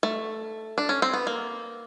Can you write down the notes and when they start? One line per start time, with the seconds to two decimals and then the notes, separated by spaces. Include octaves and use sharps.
0.03 A3
0.78 D4
0.89 C#4
1.02 C4
1.13 B3
1.27 A#3